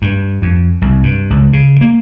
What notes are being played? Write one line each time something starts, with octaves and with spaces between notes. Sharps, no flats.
G2
F2
C2
G2
C#2
C#3
A#3